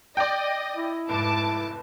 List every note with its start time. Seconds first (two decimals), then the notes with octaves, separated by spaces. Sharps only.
0.17 D5 D#5 G5
0.76 E4
1.09 F1 G#2 A5 D6